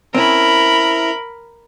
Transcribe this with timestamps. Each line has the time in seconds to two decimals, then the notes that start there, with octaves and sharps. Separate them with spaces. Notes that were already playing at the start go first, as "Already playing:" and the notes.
0.15 C4 C#4 E4 A#4 B5